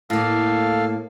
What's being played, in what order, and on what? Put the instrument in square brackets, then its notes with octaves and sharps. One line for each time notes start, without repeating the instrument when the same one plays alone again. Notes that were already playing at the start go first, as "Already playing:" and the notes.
[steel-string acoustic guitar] A2 A#3 [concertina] A4 F5